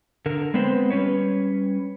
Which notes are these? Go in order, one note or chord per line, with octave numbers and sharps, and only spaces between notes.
D3 A#4
G#3 B3 C4 B4 C5
G3 C#4 B4 C#5